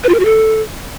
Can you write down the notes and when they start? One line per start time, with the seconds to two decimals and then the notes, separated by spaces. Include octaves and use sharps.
0.04 B4
0.09 F4
0.14 A#4
0.20 F#4
0.25 A4